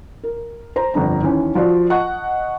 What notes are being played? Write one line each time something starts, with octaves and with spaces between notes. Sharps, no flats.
A#4
C5 A#5
G1 F2 D4 A#5
D#2 E3 C#4
F3 F4 F#4 D5
D#5 F#5 A5 C#6